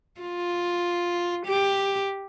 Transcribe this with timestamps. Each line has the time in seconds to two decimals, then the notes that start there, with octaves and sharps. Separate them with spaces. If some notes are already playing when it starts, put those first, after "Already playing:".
0.21 F4
1.46 G4